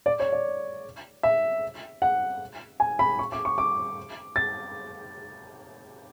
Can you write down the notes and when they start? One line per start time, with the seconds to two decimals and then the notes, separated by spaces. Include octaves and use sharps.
0.06 D5
0.20 C#5
0.32 D5
1.23 E5
2.02 F#5
2.80 G#5
2.99 B5
3.19 C#6
3.32 D6
3.45 C#6
3.58 D6
4.36 A6